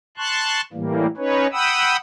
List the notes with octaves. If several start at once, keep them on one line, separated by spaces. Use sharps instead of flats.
A5 C6 C#6 F#6
A2 E3 G3 A#3
C#4 D#4 B4 C#5
F#5 G5 B5 D#6 E6